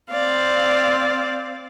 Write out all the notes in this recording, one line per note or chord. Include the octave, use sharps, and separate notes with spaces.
C4 D5 F5